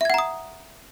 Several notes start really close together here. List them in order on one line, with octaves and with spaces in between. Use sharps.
E5 G#6 F#5 A#5 D#6